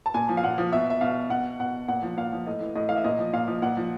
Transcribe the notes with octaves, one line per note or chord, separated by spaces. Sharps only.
A5
A#2 G#5
F3
F5
A#2 F#5
F3
B2 E5
E5
B2 F5
B2 F#5
B2 F#5
A#2 F#5
F3
A#2 F5
F3
A2 D#5
E3
A2 D#5
E3 F5
E5
A#2 D#5
F3
A#2 F5
F3
A#2 F#5
F3